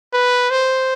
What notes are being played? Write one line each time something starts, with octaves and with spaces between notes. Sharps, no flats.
B4
C5